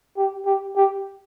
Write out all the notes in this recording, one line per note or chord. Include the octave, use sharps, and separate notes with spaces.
G4
G4
G4